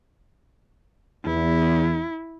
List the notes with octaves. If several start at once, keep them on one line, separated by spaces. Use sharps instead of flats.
E2 E4